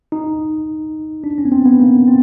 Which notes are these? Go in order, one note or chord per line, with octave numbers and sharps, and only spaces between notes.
D#4
D4
C#4
B3
C4
B3
A#3
C4